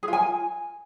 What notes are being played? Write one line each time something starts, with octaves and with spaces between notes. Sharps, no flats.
G#4
F4
G#5